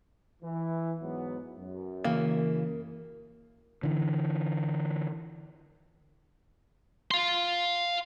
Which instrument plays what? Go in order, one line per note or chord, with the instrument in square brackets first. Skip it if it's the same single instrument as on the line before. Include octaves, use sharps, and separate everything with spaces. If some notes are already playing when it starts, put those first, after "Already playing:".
[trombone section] E3
G#2 F#3 B3
F#2
[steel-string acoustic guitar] C#3 E3 [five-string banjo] A#3
[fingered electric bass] D3 E3
[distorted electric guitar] F5 C6